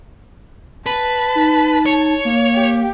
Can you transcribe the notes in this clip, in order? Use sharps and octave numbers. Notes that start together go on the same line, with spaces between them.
B4 A5
D#4
C#5
A#3
G4